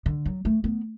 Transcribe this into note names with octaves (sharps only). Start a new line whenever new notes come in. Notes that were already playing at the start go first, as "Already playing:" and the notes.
D3
F#3
A3
B3